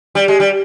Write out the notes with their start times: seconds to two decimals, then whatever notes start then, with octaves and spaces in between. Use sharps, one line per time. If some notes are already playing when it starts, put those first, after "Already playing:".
0.15 G3
0.28 G#3
0.40 G3